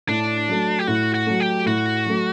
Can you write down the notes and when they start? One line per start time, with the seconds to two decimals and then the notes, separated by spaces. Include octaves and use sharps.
0.08 A2 D4
0.48 F#3 A3
0.79 G4
0.87 A2 F#4
1.14 F#4
1.27 F#3 A3
1.40 G4
1.66 A2 F#4
2.06 F#3 A3